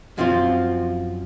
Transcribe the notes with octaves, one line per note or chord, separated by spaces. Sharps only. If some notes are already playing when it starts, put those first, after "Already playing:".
F#2 F3 C4 F4